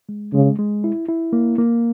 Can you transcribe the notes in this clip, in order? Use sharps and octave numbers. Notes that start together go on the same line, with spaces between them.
G#3
C#3 G#3
G#3
E4
E4
A#3
A#3